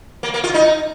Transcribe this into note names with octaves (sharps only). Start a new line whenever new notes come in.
A#3
A#3
F4
D#4